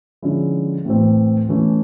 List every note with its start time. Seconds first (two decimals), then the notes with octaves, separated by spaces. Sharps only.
0.22 D3 F3 G#3 C#4 E4
0.85 A2 E3 A3 C4
1.49 E3 A3 C#4